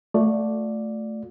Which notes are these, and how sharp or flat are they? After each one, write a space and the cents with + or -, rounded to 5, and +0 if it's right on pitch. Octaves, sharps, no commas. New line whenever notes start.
A3 +0 F4 +40 D5 +0